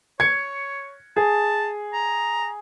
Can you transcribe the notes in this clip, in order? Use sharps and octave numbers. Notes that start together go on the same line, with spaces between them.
C#5 G#6 C#7
G#4 A5
A#5